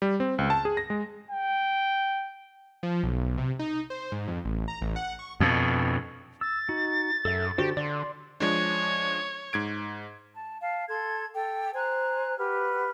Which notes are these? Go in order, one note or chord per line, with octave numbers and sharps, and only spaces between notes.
G3
C4
C#2
A5
G#4
A#6
G#3
G5
F3
B1
C3
D#4
C5
G#2
F2
A1
A#5
A1
F#5
C#6
F2 B2
E6 A6
D#4 F#4
F#2 A4 E5
D3 F#4 G4 C5
D3 D5 C6
F3 G#3 D4 C#5
G#2 G#6 D7
A5
F5 A5
A4 A5 C6 G#6
A4 G5
C5 G#5 A#5 F#6
F#4 G4 B4 F6